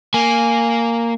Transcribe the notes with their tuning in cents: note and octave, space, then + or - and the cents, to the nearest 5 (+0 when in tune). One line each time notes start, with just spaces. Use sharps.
A#3 -10 G#5 +0